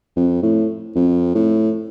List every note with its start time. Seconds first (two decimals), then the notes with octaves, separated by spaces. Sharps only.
0.16 F2
0.42 A2
0.95 F2
1.35 A2